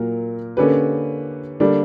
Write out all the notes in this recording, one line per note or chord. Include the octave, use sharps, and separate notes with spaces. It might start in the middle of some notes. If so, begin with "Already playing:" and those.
Already playing: A#2 F#3 A#3 A#4
D3 A#3 C#4 G4 B4
D3 G3 A#3 D4